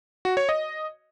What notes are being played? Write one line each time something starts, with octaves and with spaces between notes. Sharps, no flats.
F#4
C#5
D#5